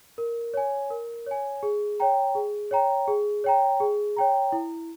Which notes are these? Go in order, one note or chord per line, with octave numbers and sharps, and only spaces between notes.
A#4
C#5 G#5
A#4
C#5 G#5
G#4
C#5 G5 A#5
G#4
C#5 G5 A#5
G#4
C#5 G5 A#5
G#4
C#5 G5 A#5
E4